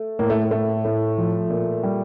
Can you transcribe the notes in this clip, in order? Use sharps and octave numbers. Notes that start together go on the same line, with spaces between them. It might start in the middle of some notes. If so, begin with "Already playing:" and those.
Already playing: A3
A2 A#3
A3
A2 A3
A2
F3
A#2
G3